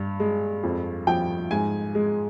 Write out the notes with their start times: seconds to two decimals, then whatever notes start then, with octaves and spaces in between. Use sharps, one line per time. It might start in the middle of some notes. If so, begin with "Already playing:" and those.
Already playing: G2
0.20 G#3
0.64 F2
1.07 F3 G5
1.51 G#2 G#5
1.95 G#3